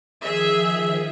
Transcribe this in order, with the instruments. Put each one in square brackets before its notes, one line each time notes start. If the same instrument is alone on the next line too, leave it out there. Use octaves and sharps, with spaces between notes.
[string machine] D#3 F3 [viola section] G#4 E5